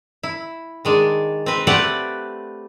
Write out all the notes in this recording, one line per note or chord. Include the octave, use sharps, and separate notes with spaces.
E4
D#3 G#3 D4
C4 B4
A3 C4 G4 B4 D5 F#5